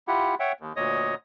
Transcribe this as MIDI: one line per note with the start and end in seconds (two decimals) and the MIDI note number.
0.08 0.35 64
0.08 0.35 65
0.08 0.35 67
0.08 0.35 78
0.40 0.52 73
0.40 0.52 76
0.40 0.52 78
0.40 0.52 79
0.60 0.73 39
0.76 1.15 38
0.76 1.15 46
0.76 1.15 73
0.76 1.15 75
0.76 1.15 87